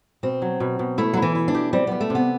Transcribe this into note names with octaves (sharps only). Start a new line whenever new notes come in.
B2 C4
F#3
B2
B2
A3 E4
F#3
E4
E3
E4
D4
G4
G3 C4
G3 B3
A3
C3 B3